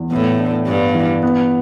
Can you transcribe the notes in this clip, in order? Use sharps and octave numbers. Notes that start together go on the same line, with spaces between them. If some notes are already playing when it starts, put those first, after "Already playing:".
Already playing: E2
A2 B3
D4
G2 B3
E3
B3